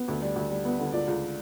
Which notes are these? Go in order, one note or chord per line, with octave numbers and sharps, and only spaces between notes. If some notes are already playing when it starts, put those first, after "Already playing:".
Already playing: B3
D2
G3
D2
G3
B3
D3
C#2 D5
C#2